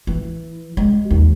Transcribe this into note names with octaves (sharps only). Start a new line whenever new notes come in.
E3
G#3
D#2